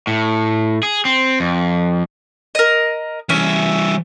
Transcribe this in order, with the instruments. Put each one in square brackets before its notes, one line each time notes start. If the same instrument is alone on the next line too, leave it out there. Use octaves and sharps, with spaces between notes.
[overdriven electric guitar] A2
G#4
C4
F2
[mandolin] A#4 D#5
[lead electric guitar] E3 G3 [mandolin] C#4 E5